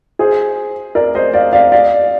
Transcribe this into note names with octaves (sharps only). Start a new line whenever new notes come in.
G#4 C5
A#4 D5
C5 D#5
D5 F5
D5 F5
D5 F5